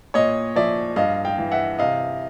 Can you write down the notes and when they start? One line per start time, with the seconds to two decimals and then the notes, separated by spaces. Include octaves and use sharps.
0.14 A#2 C#5 D#5
0.56 F3 D5 E5
0.96 G2 D#5 F5
1.25 F5 G5
1.38 E3
1.52 E5 F#5
1.79 C3 D#5 F5